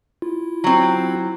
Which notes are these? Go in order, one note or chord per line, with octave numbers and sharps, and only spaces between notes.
E4 F4
F#3 C4